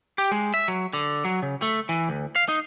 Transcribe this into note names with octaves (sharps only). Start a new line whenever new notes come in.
G4
G#3
E5
F#3
D3
F#3
C#3
A3
E3
D2
F5
D#4